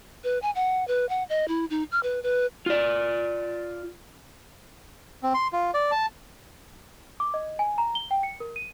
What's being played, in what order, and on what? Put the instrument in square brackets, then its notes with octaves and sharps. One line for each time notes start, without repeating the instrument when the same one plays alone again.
[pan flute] B4
G#5
F#5
B4
F#5
D#5
E4
D#4
F6
B4
B4
[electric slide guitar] F4 D5
[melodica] C4
C6
F4
D5
A5
[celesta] D6
D#5
G#5
A#5
G7
G5
C#7
A#4
D#7